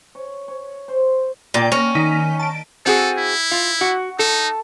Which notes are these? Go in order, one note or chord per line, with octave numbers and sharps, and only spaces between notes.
C#5
C#5
C5
A#2 D5 G5
A#3 C#4
D#3 D#4 B6
A5 D7
C4 F#4 G#4 A4
E4
F4
F#4
D#4 A4